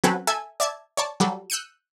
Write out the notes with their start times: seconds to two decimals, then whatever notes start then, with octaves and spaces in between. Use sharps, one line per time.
0.04 F#3 C4 C#4 F#4 A4 B4
0.27 A4 E5 G#5
0.60 D5 E5 A5 G#6
0.97 C#5 D5 A5
1.20 F#3 G3 A4
1.50 E6 F#6 G6 C#7 D#7